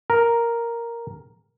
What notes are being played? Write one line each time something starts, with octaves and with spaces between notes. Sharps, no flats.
A#4